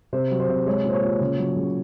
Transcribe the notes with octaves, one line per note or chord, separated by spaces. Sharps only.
C3 C5
F#3
C5
C3
G#3 C#5
A#2 C5
C#5
A#2
C#3
F#3
C#3